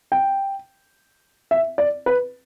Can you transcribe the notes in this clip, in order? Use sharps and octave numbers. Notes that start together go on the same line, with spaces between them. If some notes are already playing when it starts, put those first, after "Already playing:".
G5
E5
D5
B4